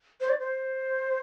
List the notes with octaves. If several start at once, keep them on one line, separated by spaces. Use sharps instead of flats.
C5
D5
C5